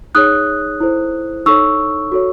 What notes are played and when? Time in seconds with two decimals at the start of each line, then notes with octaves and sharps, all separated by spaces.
0.15 D#4 G#4 C#5 D#6 F#6
0.80 E4 A4 C5
1.46 D#4 A4 C#5 C#6 E6
2.12 F#4 A4 C#5